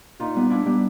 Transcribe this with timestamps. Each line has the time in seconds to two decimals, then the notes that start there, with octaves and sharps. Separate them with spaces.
0.20 A#2 D#4 F4
0.35 G3 B3
0.50 A#2 D4 E4
0.66 G3 B3